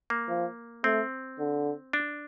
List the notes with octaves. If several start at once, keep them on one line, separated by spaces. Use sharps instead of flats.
A#3
F3
A3 C4
D3
D4